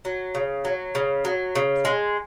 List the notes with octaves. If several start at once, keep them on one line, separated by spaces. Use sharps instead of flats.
F#3
C#3
F#3
C#3
F#3
C#3
G#3